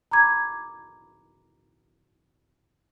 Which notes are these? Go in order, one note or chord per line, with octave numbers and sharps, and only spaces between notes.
A#5 B5 D6 G#6